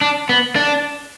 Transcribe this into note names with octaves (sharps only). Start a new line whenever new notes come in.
D4
B3
D4